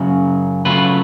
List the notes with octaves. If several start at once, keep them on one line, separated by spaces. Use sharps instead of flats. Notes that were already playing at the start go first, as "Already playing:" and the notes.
Already playing: F#2 C#3 F#3
C#3 F#3 A3 F4 B4